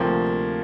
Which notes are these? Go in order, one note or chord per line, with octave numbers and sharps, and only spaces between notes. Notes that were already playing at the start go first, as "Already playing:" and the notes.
Already playing: D2 C3 F3 A#3